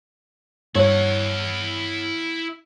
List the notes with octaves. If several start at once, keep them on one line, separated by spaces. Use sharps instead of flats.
G2 E4 C#5 F#5